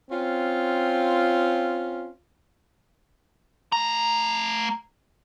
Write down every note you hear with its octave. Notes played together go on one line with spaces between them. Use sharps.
C4 C#4 F4
A3 A#5